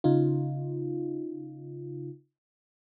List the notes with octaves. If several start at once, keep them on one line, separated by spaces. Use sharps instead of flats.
C#3 D#4 F4